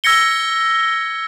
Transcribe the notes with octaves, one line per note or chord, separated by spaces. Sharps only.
E6 G#6 A#6 C#7 G7